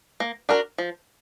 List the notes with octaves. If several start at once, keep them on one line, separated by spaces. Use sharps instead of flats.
A#3
D4 F#4 A#4
F3